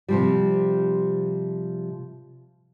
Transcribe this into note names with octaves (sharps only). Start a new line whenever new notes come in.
C3 F3 G3